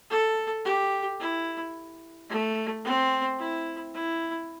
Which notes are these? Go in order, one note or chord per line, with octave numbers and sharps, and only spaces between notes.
A4
G4
E4
A3
C4
E4
E4